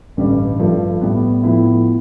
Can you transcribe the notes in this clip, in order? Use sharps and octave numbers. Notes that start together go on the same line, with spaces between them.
A1 G2 D3 G3
G2 F3 A3
A2 G3 B3
A2 F3 B3 E4